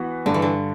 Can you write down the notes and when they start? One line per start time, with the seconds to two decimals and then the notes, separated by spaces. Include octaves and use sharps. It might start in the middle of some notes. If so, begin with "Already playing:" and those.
Already playing: E3 B3 F#4 B4
0.26 G2 D3
0.34 E3
0.42 D3